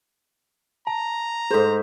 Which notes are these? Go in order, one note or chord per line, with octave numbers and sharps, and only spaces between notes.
A5 A#5
G#2 G#4 A4 C5